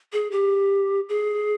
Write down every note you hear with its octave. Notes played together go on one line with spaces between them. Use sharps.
G#4
G4
G#4